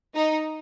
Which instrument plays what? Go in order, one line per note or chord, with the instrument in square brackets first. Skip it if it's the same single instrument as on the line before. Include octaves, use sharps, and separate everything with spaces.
[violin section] D#4